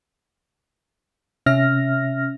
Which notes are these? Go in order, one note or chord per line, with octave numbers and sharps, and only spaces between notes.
C3 C#4 E5 F6 A#6